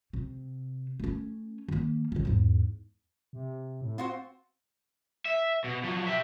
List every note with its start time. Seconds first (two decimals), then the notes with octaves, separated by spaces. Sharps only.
0.13 C3
1.00 A3 C#4
1.68 D#3 A#3
2.12 D3 C#4
2.25 E2 G#2
3.33 C3
3.81 A2
3.98 C4 F4 F#4 C5
5.25 E5
5.64 B2
5.84 F3 F#3
6.07 G4 E5